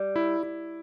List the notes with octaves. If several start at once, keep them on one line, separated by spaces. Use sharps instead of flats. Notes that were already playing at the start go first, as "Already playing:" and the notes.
Already playing: G3
E4
E4